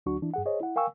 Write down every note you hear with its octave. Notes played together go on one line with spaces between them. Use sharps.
D2 F#3 D4 F#4 C#6
E3 D4 E4
G2 G#4 F#5
G#4 C5 C#5 D#5
E4 F#5
A#4 F5 G5 G#5 C#6 E6